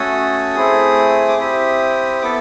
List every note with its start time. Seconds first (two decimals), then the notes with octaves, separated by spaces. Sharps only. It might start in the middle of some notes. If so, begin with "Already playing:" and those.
Already playing: A3 C#4 F#4 A4 D#6
0.55 A3 C4 E4 G#4
1.28 D6
1.39 C4 E4 G4 D#6
2.22 B3 E4 A4 D6